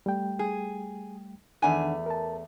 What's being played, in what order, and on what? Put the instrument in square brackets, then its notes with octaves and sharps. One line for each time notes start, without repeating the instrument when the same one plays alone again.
[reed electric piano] G3 A3 G5
[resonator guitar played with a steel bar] G#4
[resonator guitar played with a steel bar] E2 A3 G#5 [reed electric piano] D#3 D4 F#5
[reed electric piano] A#4 A5